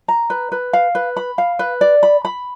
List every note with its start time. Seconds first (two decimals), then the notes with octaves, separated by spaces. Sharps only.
0.08 A#5
0.30 B4
0.52 B4
0.73 F5
0.95 B4
1.17 B5
1.38 F5
1.59 B4
1.81 D5
2.03 B5
2.25 B5